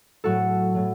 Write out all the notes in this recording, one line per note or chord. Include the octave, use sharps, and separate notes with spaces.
A2 F#3 A3 F#4 A4
A2 F#3 A3